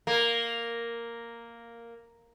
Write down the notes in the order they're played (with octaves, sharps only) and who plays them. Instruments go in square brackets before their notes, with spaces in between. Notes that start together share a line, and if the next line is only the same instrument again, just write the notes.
[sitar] A#3